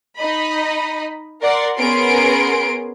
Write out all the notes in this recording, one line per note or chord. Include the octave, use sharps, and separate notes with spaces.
D#4 D#5 B5
A#4 D5 F#5 C6
B3 C#4 G#4 A#4 C6 D7